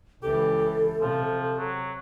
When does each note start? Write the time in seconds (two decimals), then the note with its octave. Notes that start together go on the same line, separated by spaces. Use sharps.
0.23 C#2 E3 G4 A4
1.01 C3 F3
1.58 F#3